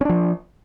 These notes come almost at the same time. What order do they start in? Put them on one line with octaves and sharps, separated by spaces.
C#4 D4 F3